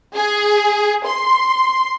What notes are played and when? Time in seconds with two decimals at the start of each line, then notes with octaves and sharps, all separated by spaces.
0.15 G#4
1.05 C6